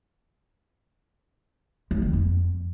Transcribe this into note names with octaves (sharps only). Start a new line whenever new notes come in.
F#2
D#3
F2